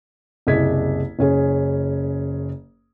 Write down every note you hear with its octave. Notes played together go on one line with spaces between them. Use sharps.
F#1 C2 G#4 D#5 G#6 B6
F#1 C#4 G#4